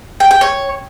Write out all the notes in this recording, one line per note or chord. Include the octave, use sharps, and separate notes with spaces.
G5
G5
C#5